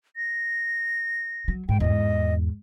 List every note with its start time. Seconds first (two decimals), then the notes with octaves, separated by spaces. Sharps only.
0.16 A#6
1.48 F#3
1.69 G#2 G5
1.80 E2 G#2 D#5